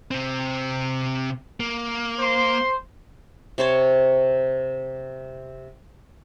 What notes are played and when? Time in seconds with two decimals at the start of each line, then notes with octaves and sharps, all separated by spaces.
0.11 C3 C4
1.60 A#3
2.19 C5 C6
3.58 C3 C5 C#5 A5